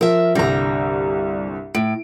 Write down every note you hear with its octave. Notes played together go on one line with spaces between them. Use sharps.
F3 A#4 E5
C2 G2 D3 G3 A#5
A2 D7